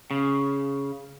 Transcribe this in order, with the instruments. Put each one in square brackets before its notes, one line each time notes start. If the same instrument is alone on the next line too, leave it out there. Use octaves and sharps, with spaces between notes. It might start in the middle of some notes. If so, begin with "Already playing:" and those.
[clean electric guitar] C#3